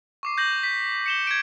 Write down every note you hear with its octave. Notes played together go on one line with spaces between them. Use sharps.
C#6 D6 C7
G6 A#6 F#7
B6
C#7 E7 G7
G#6 D7